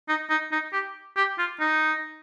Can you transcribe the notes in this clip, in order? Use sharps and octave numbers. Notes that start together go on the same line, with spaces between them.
D#4
D#4
D#4
G4
G4
F4
D#4